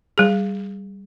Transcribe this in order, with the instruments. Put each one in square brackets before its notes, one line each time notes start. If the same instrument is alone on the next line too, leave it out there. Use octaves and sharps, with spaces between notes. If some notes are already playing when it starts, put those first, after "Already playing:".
[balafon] G3 G#4